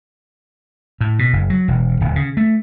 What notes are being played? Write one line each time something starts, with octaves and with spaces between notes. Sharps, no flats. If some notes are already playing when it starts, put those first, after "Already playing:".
A2
B2
F#1
F#3
E1
D1
C#3
A3